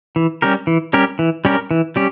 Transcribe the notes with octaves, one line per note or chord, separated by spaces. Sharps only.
E3
G3 C#4 G4 A#4
E3
G3 C#4 G4 A#4
E3
G3 C#4 G4 A#4
E3
G3 C#4 G4